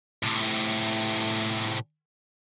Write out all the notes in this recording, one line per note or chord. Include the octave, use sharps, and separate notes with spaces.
A2 C3